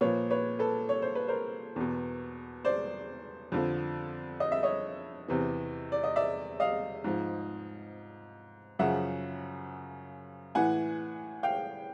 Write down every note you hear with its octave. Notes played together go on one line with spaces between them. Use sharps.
A#2 F3 B4 C#5
B4 C#5
A4 B4
C#5
C5
B4
A#4 C5
E2 B2
C5 D5
F2 D3 F3
D#5
E5
C#5 D#5
E2 C3 E3
D5
D#5
D5 E5
D#5 F5
G#2 F3
F#2 C#3 F3 E5 F#5
A2 E3 F#5 G#5
F5 G5